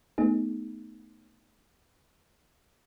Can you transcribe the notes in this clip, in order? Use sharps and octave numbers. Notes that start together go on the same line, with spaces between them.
A3 B3 D#4 G#4